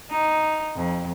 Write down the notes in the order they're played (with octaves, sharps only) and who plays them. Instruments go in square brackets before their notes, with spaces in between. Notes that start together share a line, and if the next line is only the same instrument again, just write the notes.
[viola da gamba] D#4
F2